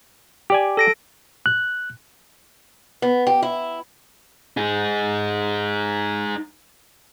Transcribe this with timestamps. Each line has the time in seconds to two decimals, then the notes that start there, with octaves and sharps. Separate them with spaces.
0.50 G4 D5 G#5
0.77 A4 A#6 D7
1.46 F#6
3.02 B3
3.27 G4
3.43 E4
4.57 D#4 G#4